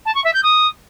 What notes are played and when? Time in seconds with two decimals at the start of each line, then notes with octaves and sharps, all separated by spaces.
0.05 A5
0.15 C#6
0.24 E5
0.34 G6
0.43 D#6